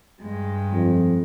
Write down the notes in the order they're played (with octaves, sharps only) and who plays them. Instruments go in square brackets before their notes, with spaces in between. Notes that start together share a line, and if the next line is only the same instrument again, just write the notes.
[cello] G2 G#3
[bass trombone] F2